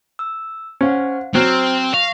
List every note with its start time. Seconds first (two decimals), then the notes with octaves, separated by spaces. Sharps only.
0.19 E6
0.81 C#4 C5 F5 F#5
1.35 F#3 C4 C5 F6 G#6
1.94 F5 C#6 A#6